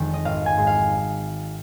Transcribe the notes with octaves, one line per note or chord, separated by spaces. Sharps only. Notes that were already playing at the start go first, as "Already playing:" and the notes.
Already playing: F1 F2 D#3 G#3
D#5
G#1 F5
G#5
G#2 G#3
F5